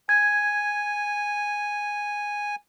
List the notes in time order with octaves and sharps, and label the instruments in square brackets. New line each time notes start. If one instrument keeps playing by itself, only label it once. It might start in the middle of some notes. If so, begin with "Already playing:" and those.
[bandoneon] G#5 [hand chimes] G#6